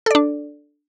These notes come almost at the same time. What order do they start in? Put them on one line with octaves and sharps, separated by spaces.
A4 D5 D4